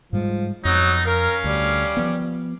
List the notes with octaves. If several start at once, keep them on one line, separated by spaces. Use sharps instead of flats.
G#2 F3 G3 G#3
F2 F#3 B3 D#4
C#4 A#4 F5
D2 G3
F3 B3